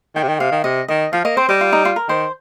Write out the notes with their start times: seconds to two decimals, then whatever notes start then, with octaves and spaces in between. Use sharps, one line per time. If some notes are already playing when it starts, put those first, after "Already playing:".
0.15 D#3 G5
0.23 C3
0.28 D#3
0.39 C3 F5
0.51 D#3
0.64 C3 D#5
0.88 D#3 D#5
1.13 F3 F5
1.25 A#3 D#5
1.36 C4 C5
1.48 G3 D#5
1.61 F4
1.73 D#4
1.85 F4
1.96 A#4
2.08 D#3 C5